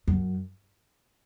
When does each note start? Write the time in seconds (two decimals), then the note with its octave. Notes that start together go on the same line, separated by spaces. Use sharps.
0.08 F#2